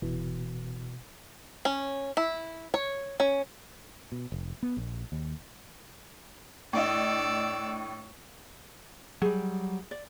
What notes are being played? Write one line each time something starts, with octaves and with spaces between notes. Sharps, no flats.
F1 B2 E3
C#4
E4
C#5
C#4
B2
F1
B3
A#1
D#2
A2 D4 D5 D#5 E6
F#3 G3 G#4
D5